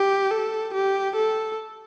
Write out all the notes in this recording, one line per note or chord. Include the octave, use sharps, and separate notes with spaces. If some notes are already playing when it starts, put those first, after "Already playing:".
Already playing: G4
A4
G4
A4